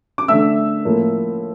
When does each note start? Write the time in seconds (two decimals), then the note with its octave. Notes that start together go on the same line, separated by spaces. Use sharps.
0.18 D6
0.28 D3 A3 E5 E6
0.85 A2 F3 A#3